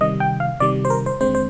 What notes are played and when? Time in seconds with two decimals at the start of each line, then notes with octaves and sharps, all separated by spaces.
0.01 C3 D#3 G3 D#5
0.20 G5
0.40 F5
0.60 C3 D#3 G3 D5
0.85 C5
0.90 A#4
1.06 C5
1.21 D#2 D3 G#3 C4 C5
1.35 C5